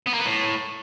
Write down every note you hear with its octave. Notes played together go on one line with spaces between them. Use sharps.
B3
A#3
B3
A2